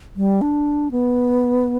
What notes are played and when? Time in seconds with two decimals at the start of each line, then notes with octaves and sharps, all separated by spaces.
0.16 G3
0.41 D4
0.91 B3